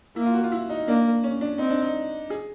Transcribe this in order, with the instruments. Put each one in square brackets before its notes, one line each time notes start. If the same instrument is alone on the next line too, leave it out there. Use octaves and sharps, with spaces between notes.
[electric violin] A#3 [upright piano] E4
[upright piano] F4
F#4
F4
E4
D#4
[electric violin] A#3 [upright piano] D4
[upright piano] C#4
D4
[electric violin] C4 [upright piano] D#4
[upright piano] D4
D#4
G#4